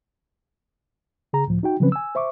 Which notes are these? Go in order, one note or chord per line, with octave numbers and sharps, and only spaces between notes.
C#3 G#4 A#5
C#2 A2 F3
D#4 F#4 G5
C#3 F3 F#3 C4 C#4 B4
G#5 E6
C5 E5 C#6 D6